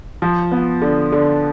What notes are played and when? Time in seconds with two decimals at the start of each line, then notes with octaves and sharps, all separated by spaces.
0.22 F3
0.52 B3
0.82 D3
1.12 D3